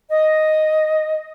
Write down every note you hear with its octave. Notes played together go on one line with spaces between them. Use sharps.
D#5